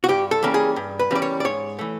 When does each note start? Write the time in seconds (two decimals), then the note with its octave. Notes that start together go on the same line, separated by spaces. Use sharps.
0.04 F#4
0.09 G2 G4
0.31 A4
0.43 E3 G3 A#3 C#4
0.54 G#4
0.76 G2
0.99 B4
1.11 E3 G3 A#3 C#4 D5
1.22 C#5
1.40 D5
1.45 G#2 C#5
1.79 E3 A3